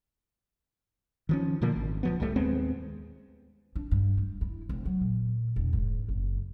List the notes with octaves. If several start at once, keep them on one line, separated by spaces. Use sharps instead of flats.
D#3 F3 C#4
A#2 D3 F3 A#3
G#1
D1 F3 B3
C2 A2 G3 A3
D#2 G#3 B3 C4
D4
G2
G3
E4
F1
F#3
A#2
E1
G#2
F#1